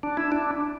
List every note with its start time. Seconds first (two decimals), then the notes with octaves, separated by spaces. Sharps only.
0.03 D4
0.17 E4
0.32 D4